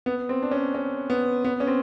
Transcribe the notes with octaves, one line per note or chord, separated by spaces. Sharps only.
B3
C4
D4
C#4
C#4
B3
B3
C#4
C4